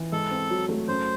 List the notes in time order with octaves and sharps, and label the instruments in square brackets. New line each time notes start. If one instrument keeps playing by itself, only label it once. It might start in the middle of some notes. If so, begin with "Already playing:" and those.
Already playing: [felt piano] E3
[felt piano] G#2 [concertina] A4
[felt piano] C4
F#3
A3
[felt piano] F#2 [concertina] C5